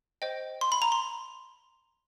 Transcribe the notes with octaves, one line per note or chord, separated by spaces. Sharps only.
C5 D#5 G5
C6
B5
A#5
C6